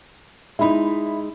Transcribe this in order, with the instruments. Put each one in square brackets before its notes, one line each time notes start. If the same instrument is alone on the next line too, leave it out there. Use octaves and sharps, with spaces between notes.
[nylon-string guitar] G#3 D#4 [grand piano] E4 B5